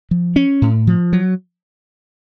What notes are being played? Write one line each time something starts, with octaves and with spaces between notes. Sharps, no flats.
F3
C#4
A2
F3
F#3